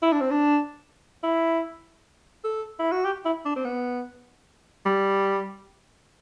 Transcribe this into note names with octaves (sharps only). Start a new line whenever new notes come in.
E4
D4
C4
D4
E4
A4
E4
F#4
G4
E4
D4
C4
B3
G3